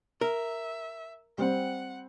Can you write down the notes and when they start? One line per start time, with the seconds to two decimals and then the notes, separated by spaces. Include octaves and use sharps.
0.21 A#4 E5
1.38 G3 C4 F#5